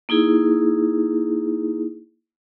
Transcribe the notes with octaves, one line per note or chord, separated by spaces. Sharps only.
A#3 D#4 E4 G#4